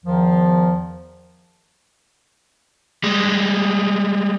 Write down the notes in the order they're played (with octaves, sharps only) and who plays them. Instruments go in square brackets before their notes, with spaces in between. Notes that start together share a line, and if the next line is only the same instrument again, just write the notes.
[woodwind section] E2 D#3 F3
[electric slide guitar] G3 G#3